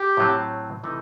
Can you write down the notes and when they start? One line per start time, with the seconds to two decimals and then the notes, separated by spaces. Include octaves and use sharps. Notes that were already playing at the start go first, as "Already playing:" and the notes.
Already playing: G4
0.17 A2 F#3 C4
0.84 C3 E3 A3 D#4